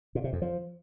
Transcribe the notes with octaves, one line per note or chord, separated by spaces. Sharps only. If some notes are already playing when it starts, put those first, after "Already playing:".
A#2
C3
F2
F3